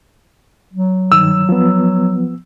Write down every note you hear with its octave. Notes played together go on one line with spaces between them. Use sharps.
F#3
G2 D#3 E6
F3 B3